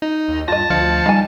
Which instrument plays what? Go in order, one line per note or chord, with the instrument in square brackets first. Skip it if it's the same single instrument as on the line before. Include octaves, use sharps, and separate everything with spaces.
[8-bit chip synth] D#4
[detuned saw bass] D#2
[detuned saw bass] G2 [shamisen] F4 D#5 [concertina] A5 [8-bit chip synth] A#6
[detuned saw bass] D2 [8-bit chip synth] F3 F5 C#7
[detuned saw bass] G3 [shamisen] D#4 G#5